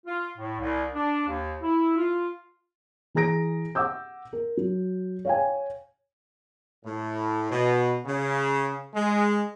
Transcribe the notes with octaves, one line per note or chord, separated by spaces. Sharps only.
F4
A2
C2
D4
D#2
E4
F4
E3 G#4 A#5 A#6 D7
F#5 D6 E6 G6
A#4
F#3
C#5 F5 G5 G#5
A2
B2
C#3
G#3